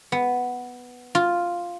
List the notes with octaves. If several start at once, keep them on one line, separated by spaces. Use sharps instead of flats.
B3
F4